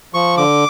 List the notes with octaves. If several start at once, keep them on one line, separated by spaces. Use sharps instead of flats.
F3 C#6
D3 D6